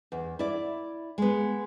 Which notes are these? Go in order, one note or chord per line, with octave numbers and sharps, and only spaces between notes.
E2
E4 D5
G#3 B3